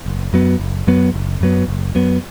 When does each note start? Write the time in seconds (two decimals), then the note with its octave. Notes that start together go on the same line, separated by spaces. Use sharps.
0.06 F#1
0.33 F#2 F#3 B3
0.60 F#1
0.87 F#2 F#3 B3
1.14 F#1
1.41 F#2 F#3 B3
1.68 F#1
1.95 F#2 F#3 B3